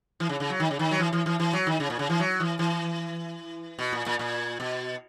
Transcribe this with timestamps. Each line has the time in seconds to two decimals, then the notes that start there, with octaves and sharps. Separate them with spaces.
0.20 E3
0.29 C#3
0.40 C#3
0.50 F#3
0.60 D#3
0.71 C#3
0.79 D#3
0.91 F#3
0.99 E3
1.13 E3
1.26 E3
1.40 E3
1.53 F#3
1.67 D#3
1.80 C#3
1.90 A#2
1.99 C#3
2.10 E3
2.20 F#3
2.40 E3
2.59 E3
3.79 B2
3.92 A#2
4.06 A#2
4.19 A#2
4.60 B2